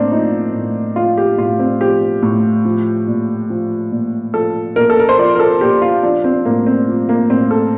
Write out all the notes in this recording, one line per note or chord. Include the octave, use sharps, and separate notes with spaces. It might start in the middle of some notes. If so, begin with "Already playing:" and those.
Already playing: A2 A#3 C4 D4
F3 D#4
A2
F3 F4
G4
A2 F4
C4
F3 G4
A2
F3
A#2
F3
A#2
F3 A4
A#2 A#4
A4
A#4
C5
F3 D5
A#4
A4
A#2 G4
F4
F3 D4
C4
A2 A#3
C4
F3
A#3
A2 C4
A4